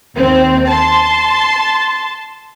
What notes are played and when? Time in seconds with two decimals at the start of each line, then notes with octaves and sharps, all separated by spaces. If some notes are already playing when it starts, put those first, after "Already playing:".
0.16 D#2 C4
0.67 A5 C6